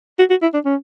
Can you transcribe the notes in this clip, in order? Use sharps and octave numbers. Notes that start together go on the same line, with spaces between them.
F#4
F#4
E4
D4
C#4